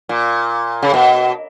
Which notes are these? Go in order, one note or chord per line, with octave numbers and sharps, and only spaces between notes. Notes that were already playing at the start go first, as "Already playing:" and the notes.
A#2
C#3
B2